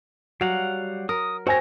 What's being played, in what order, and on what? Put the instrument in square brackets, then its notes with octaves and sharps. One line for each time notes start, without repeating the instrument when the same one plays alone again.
[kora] F#3 [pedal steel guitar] G3 F5 F#5
[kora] A#4 [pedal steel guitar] D#6
[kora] C4 [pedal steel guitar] F#4 A#4 C#5 [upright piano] C5 G#5 A#6